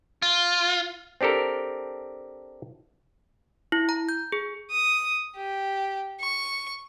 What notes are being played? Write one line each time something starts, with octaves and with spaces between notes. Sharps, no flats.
F4
C4 D4 G4 A4 A#4
E4
A#5
G6
G#4
D#6
G4
C#6